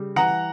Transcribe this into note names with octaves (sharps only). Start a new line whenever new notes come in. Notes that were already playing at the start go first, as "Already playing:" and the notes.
Already playing: C#3 G3
E3 F#5 A#5